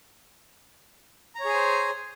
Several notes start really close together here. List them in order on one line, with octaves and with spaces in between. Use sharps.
A#5 C#5 G#4 G#5 C5